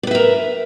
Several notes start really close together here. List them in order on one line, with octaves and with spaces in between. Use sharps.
D5 B4 E5 A#4